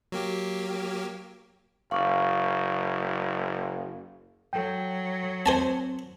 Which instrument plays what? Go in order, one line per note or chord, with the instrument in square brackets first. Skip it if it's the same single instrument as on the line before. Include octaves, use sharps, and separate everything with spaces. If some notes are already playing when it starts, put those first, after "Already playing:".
[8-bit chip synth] F#3 A#3 G4
[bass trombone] F#1 [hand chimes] F5 C#6 D6
[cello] F#3 [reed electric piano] A4 G5
[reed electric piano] C4 [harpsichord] C5 G#5 A5